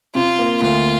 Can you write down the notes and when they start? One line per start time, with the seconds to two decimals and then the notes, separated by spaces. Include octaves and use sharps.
0.15 C3 F4
0.39 A#3
0.62 D2 F4